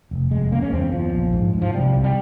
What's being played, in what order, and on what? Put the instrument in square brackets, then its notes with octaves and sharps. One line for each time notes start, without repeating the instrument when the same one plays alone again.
[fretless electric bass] F1
F1 G#3
C#3 A#3
C#4
E2 C4
E2 F3
A#1
G#2
G#2
F3
C3 G3
C2
G3